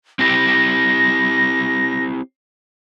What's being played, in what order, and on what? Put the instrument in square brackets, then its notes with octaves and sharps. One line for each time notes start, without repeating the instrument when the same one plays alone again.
[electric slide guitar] C4 E4 G4 [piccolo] A#6